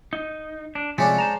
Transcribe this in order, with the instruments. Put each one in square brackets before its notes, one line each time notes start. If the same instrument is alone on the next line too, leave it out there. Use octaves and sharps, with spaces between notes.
[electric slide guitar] D#4
D4
[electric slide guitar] C3 F3 A3 [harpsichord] G#3 C#4 D4
[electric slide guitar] C5 A5 A#5